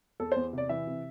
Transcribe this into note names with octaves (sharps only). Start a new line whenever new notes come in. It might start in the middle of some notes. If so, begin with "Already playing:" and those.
E2 A4
E2 C5
C3 D5
E3 E5
C3